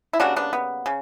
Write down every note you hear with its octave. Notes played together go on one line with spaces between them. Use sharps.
E4
C#3 G3 A#3 D4 F#4
B3 D4
B3
C#3